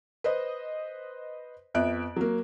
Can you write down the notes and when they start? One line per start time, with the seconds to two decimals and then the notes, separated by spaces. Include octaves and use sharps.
0.24 B4 C5 D#5
1.74 F2 B3 E5 F#6 D7
2.16 F#3 A#3